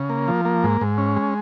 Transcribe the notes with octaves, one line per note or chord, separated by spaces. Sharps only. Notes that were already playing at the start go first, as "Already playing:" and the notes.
Already playing: C#3
A#3
F3
A#3
G#2
G#2
C#4
G#3